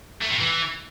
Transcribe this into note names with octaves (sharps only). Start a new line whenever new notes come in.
A3
A2
E3